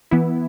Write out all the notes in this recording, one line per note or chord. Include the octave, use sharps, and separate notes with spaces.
E3 B3 E4